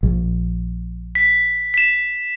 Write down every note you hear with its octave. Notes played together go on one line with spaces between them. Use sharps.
A#1
B6
B6 E7